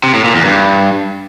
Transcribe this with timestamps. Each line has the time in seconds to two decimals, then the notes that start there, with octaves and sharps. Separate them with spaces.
0.04 C3
0.14 A2
0.24 A#2
0.35 E2
0.45 G2